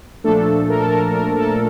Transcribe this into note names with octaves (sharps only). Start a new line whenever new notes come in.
A#2 F3 A3 D4 A4
A#4
A4
A#4
A#4
A4